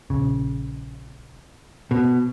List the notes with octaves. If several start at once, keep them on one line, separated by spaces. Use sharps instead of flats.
A#1 C#3
B2